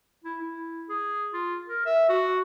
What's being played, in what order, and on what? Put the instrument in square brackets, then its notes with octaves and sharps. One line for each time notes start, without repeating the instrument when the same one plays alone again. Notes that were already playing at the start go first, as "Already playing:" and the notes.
[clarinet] E4
E4
G#4
F4
A#4
E5
F#4